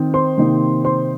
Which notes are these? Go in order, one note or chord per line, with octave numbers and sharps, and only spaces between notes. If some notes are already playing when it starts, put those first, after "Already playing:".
Already playing: D#3 C4 D#4
C5 C6
C3 D#3 A#3 D#4
C5 C6